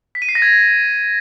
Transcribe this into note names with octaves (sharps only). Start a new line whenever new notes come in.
B6
D#7
C7
A#6
G#6